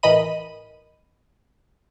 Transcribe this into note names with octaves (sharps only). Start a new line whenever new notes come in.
A1 E3 A#4 D#5 B5 D#7